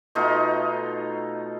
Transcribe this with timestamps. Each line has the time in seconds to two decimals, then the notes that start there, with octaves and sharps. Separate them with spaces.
0.15 B2 A3 D#4 F4